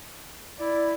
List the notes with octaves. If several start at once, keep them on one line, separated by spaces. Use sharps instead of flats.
E4 D5